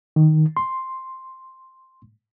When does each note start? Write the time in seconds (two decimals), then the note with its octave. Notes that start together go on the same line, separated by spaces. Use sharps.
0.16 D#3
0.57 C6